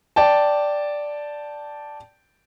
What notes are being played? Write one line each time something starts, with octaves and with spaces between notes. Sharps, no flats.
D5 G5 A5